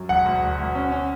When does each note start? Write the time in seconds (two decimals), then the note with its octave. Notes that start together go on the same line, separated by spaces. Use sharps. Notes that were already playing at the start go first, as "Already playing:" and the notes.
Already playing: F#2
0.09 E1 F#5
0.26 D2
0.42 E1
0.58 D2
0.75 C#4
0.92 C#4